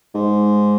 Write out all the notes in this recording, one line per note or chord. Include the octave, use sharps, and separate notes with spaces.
G#2